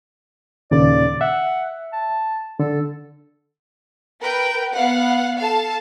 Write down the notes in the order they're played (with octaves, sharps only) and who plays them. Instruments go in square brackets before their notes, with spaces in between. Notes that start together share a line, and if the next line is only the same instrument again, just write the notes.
[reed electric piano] D#2 A#2 C#3 [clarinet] D5
[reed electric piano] E5 [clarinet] F#5
[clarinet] A5
[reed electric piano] D3 [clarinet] A4
[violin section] A#4 B4 G5
B3 F5 F#5
A4 F5 A5